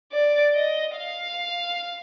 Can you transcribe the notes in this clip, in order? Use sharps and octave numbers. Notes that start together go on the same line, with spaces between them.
D5
D#5
F5